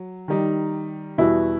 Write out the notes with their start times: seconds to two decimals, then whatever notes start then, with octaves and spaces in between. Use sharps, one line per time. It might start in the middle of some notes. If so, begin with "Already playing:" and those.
Already playing: F#3
0.28 D#3 G3 D#4
1.18 E2 B2 G3 B3 E4 F#4